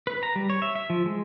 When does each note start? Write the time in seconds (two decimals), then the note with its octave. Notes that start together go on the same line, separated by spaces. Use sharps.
0.07 B4
0.23 A#5
0.36 G3
0.50 C#5
0.62 E5
0.75 E5
0.90 F3
1.06 G#3